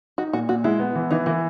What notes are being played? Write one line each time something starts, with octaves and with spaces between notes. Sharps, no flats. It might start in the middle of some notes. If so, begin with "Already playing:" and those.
D#4 F#4
A#2 F#4
A#2 F#4
G#3 E4
B3
E3
E3 D#4
E3 A#3